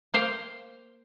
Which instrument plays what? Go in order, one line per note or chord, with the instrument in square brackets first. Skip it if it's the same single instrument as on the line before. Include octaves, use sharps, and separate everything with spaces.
[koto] A#3 C5 F5 G5